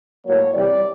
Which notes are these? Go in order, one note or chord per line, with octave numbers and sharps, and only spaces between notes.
A2 F#3 A#3 C#5
C3 E3 G3 D5